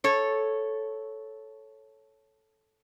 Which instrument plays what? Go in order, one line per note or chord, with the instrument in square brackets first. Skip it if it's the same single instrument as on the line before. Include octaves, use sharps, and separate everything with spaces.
[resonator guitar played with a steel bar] A4 C#5